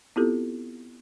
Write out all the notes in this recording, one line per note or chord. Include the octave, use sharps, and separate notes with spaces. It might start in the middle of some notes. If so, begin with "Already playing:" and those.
B3 C4 E4 F4 G4 A4